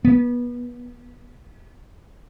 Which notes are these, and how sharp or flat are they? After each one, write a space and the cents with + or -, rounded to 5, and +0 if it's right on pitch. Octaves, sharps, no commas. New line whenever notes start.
B3 -25